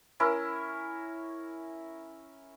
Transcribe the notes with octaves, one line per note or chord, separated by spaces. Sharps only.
C#4 E4 A#4